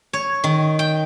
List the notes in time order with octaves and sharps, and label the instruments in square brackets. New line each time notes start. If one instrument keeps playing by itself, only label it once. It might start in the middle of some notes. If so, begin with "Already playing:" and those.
[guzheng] C#5
D#3
G5